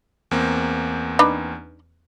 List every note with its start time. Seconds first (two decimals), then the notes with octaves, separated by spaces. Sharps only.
0.31 E2 A#3 C4
1.19 D4 D#4 B4